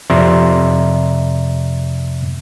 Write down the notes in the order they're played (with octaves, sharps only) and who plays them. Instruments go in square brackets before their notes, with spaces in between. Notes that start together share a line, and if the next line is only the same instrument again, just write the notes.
[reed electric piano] F2 C3 D5 E5 A#5 C6